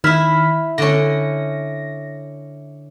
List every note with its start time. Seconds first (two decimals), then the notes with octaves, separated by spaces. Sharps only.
0.04 D#3 E4 E5 F6 B6
0.78 D3 C#4 A#6